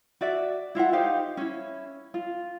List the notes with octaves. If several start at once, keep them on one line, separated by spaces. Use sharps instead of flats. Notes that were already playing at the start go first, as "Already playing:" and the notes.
F#4 D5 E5
E4 F4 E5 F#5
D#4 G4 C5 F5
C#4 E4
F4